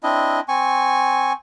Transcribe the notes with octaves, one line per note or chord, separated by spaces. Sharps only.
C4 D4 E4 D#5
C4 G#5 C#6